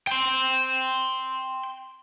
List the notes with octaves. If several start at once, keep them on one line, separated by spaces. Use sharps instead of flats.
G5 C6